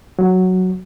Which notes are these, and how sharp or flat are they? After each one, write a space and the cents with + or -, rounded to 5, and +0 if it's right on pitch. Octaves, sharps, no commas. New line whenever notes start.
F#3 +0